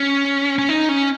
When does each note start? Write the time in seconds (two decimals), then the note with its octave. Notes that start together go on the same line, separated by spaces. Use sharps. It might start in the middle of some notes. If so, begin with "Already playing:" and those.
Already playing: C#4
0.59 C#4
0.69 D#4
0.89 C#4